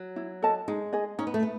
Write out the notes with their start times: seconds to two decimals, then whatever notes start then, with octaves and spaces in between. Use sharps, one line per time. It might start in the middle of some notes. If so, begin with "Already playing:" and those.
Already playing: F#3
0.16 E4
0.42 A4 D#5 A5
0.68 G#3 D#4
0.93 G#4 D#5
1.19 C#4 D#4
1.27 B3
1.34 A3
1.43 B3